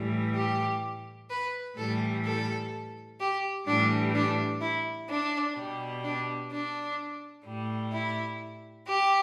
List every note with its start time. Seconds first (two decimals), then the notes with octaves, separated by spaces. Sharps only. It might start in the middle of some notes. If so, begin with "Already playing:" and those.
Already playing: A2 E3 G3
0.35 G4
1.30 B4
1.77 A2 E3 G3 A4
2.24 A4
3.20 G4
3.67 A2 E3 G3 D4
4.14 D4
4.61 E4
5.09 D4
5.56 B2 G3
6.04 D4
6.51 D4
7.46 A2 G3
7.93 E4
8.87 G4